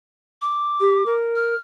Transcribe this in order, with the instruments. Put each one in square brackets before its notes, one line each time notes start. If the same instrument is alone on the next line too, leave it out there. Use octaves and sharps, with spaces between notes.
[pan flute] D6
[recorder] G4
A#4
[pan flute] F6